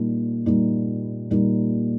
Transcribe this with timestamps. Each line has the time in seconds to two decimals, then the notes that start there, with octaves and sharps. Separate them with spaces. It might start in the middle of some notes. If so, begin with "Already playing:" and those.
Already playing: A#2 G3 A#3 D#4
0.46 A#2 G3 A#3 D#4
1.31 A#2 G3 A#3 D#4